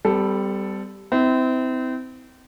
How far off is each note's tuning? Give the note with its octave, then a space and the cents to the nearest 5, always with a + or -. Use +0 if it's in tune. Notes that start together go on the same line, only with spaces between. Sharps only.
G3 +0 C4 -45 A4 +0
C4 -30 E4 -35